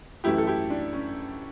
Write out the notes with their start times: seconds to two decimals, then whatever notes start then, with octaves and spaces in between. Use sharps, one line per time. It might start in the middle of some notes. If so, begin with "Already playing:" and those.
0.24 F#2 E3 A3 E4 G4
0.38 A4
0.47 E4 G4
0.70 D4
0.93 C#4